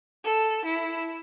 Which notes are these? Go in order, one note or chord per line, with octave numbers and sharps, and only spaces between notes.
A4
E4